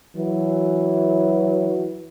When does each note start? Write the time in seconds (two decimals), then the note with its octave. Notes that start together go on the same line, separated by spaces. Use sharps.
0.17 E3 F#3